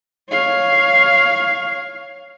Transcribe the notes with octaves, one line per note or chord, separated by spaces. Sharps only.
C#5 F5